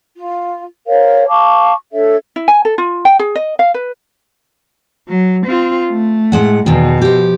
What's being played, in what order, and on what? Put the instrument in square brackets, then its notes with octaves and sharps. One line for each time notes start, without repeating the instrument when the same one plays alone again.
[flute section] F4
A#4 C5 C#5 F5
F5 A5 C#6 D6
D4 A4 C#5 E5
[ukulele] E4
G#5
A4
F4
G5
G#4
D#5
F5
B4
[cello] F#3
C4 F4
A3
[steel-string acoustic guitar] A2 G#3 F#5
[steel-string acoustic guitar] E2 D#3 [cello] B2
[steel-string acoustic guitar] F3 G4